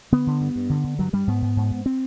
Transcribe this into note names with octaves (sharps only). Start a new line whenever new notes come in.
D3 B3
D3
G2
G2
D3
D3
G2 F#3
G2 G3
G#2 B3
G#2
G#2
G#2
C4